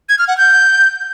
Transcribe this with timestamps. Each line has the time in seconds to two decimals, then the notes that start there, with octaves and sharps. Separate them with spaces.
0.09 G#6
0.19 F6
0.28 F#5
0.38 G6